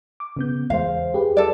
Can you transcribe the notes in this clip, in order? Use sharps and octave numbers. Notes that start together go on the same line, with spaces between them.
D6
C#3 B3 G6
E2 G#3 C5 F5
G4 G#4 B4
A4 D5